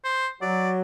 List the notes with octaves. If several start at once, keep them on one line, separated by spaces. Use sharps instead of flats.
C5
F#3 F#4 D5